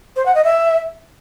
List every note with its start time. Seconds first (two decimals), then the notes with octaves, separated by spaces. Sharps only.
0.16 C5
0.26 F#5
0.35 D#5
0.44 E5